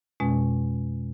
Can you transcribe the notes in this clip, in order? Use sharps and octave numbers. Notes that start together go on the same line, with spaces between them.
F2 B2 G#3 C#4